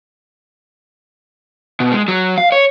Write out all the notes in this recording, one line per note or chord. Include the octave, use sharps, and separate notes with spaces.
B2
G#3
F#3
F5
C#5